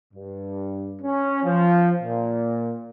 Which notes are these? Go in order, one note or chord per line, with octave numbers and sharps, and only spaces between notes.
G2
C#4
F3
A#2